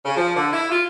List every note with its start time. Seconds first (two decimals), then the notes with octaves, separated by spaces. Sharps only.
0.05 C#3
0.17 F3
0.36 D3
0.53 E4
0.70 F4